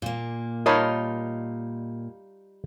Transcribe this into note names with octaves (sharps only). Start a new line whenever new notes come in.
A#2 A#3
G3 D#4 F4 A#4 C#5 D#5 A5 B5